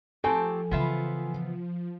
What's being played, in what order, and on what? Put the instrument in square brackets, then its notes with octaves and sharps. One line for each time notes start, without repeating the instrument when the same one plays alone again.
[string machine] F3 [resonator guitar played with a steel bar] A3 C4 G4 [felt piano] A4 G#5
[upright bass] C#3 E3 [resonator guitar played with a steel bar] B3 F4 E5